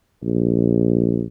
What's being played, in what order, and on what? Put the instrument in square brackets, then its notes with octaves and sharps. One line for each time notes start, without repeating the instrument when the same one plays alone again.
[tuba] A#1